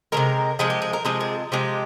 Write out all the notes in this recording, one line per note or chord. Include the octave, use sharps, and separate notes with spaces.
C3 F3 G#3 A#4
C3 F3 G#3 G#4
G4
G#4
A#4
C3 F3 G#3 G#4
G#4
C3 F3 G#3 G4